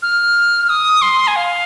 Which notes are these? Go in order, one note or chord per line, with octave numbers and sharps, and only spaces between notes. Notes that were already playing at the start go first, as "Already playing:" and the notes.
F6
F6
D#6
C6
G#5
F5